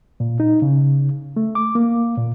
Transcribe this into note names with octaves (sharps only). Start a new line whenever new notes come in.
A#2
D#4
C#3
A3
D6
A#3
A#2